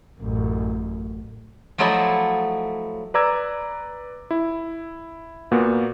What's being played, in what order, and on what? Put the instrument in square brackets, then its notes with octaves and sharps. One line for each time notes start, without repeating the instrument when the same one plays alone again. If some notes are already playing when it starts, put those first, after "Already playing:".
[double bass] A1 F#2
[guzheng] F3 F#3 A3 E4 D5 D#5
[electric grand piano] B4 D5 A#5 D6 E6 G#6
E4
A#2 A#3 B3 F#4